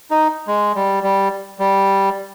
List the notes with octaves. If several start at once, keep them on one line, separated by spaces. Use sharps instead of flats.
D#4
G#3
G3
G3
G3